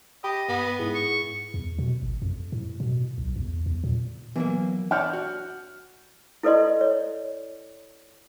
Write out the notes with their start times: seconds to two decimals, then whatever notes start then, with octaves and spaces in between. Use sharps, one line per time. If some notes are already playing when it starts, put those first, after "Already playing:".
0.24 G4 D#5 B5
0.49 G2 B3
0.79 G#2 E4 G#4
0.94 C#6
1.54 E2
1.79 B2
2.03 G#1
2.22 F2
2.52 A2
2.80 B2
3.18 B1
3.36 E2
3.66 E2
3.84 A#2
4.36 E3 F#3 A#3 B3
4.91 D4 C#5 D5 F#5 F6 G6
5.13 F#4
6.43 E4 A4 B4 D5 D#5 C6
6.81 C#5